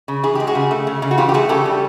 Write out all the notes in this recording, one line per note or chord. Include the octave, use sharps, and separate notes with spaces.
C#3
E3 G#4
G#3 G4
F#4 G#4
C#3
A3
C#3
C#3
F#4
E3 F4 G4
G4
A3 F#4 G#4
C#3 G4 A4
G3